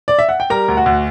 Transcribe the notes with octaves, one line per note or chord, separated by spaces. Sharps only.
D5
E5
F#5
G5
G3 A#4 A#5
D2
F#4 F#5
D2